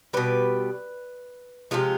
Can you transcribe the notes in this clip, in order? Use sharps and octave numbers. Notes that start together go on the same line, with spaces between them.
B2 G3 B4
C3 F3 G#3 F4